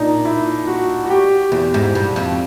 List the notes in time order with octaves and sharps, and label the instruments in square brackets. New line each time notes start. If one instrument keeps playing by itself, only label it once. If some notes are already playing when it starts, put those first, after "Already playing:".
Already playing: [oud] A#2 [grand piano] D4 D#4
[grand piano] E4
F#4
F#4
G4
[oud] E2
G#2
G2
F2